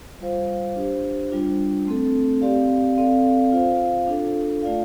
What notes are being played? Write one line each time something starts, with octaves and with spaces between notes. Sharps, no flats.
G3 F4 C5 F5
D4 G4 C5
G3 D4 F4
A3 C4 A4
C4 G4 D5 F5
C4 A4 D5 F5
F4 C5 F5
D4 F4 A4
A3 F4 D5 F5